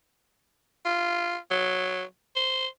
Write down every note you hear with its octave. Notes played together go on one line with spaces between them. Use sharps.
F4
F#3
C5